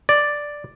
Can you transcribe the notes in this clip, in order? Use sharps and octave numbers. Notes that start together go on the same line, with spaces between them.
D5